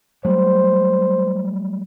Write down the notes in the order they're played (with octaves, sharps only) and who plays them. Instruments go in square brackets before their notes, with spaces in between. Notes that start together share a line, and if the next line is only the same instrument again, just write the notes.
[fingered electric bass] F#3 G3 A3 [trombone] C5